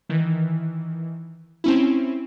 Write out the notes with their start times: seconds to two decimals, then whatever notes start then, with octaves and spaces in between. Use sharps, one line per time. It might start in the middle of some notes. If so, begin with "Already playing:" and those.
0.09 D#3 E3
1.64 C4 C#4 E4